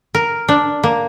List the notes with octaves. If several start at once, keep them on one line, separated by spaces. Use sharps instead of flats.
A#4
D4
A#3